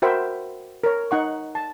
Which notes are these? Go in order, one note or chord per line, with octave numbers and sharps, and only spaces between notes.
F#4 A#4 C5 E5 G5 B5
A#4 C#5
D#4 F#5 C#6
A5